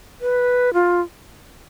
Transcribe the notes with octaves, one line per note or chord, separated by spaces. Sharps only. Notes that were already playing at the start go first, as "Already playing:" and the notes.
B4
F4